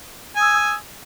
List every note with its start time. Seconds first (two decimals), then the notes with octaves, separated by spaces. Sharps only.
0.36 G#5
0.39 D#6
0.42 E6